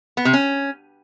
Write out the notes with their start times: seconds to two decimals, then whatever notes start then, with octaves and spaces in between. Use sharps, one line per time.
0.17 B3
0.25 C3
0.33 C#4